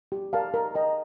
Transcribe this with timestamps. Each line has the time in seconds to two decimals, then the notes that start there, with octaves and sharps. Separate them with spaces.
0.12 G4
0.33 A#4 D5 F5 A5
0.54 A#4
0.75 D#5 G5 A#5